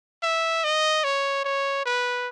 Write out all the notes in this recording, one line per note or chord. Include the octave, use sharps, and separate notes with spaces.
E5
D#5
C#5
C#5
B4